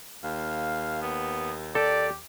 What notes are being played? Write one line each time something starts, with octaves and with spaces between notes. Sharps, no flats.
D#2 F5
B3
G4 A4 D5